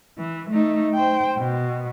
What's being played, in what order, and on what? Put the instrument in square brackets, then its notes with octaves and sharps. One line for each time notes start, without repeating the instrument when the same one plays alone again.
[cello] E3
A3 D#4
C5 G5
B2